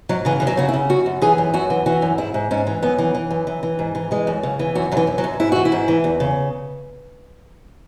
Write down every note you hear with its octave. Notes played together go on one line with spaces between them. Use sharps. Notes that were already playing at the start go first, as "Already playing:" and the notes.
G#2 F#3
C#3 E3
F#2 E3
F#3
C#3 F#4
E4
C#3
F#2 F#4
F#2
E3 G#4
F#2
F#2 F#4
E3
E3 F#4
F#2
G#2 E4
G#2
G#2 C#4
E3
F#2 B3
E3
E3
F#2
E3
E3
G#2
E3
E3 G#3
F#2
C#3
E3
F#2 F#4
F#2 F#3
E3
F#2
F#3
F#2
G#2 E4
E3 F#4
E4
G#2
E3
E2
C#3